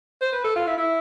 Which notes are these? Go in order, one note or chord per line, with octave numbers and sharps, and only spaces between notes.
C5
B4
A4
F4
E4
E4